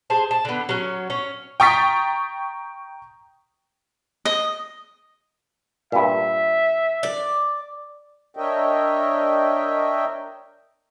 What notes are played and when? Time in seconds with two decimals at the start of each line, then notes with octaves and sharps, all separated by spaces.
0.10 G#4 C5 A5
0.31 A5
0.45 D3 B3
0.69 F#3 C#4
1.10 C#4 C#5
1.60 G5 A#5 C#6 D#6 A6 B6
4.25 D#5
5.92 G2 A#2 E5
7.03 D5
8.37 D4 A#4 C#5 D#5 E5 G5